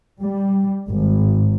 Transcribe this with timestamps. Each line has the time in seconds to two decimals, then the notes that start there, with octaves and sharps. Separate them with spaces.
0.20 G3
0.89 G#1